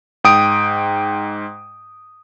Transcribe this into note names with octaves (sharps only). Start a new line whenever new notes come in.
G#2 G5 D#6 D7